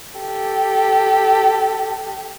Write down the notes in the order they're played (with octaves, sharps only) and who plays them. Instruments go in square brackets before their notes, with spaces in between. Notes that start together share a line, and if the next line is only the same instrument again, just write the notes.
[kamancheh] G4 A4